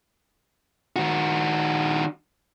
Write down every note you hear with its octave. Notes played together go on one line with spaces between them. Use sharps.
D#3 F#4